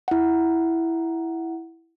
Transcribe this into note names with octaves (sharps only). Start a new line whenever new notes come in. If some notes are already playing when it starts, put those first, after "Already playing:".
E4 F#5